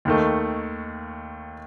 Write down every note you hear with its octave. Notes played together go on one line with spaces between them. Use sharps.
D#2 D#3 A3